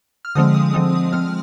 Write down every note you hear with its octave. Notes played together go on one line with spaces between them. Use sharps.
F6
D3 F3 G#3 C4 D#6
D#6
D3 F3 G#3 C4 D#6
F3 G#3 C4 F6